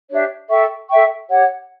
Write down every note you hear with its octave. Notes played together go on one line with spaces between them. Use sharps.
D4 G4 C#5 E5
A4 E5 G5 C#6
A4 E5 G5 C#6
G4 C#5 F#5